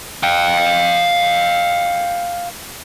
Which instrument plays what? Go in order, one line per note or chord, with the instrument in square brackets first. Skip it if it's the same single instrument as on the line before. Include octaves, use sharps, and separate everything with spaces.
[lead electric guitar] F5 G5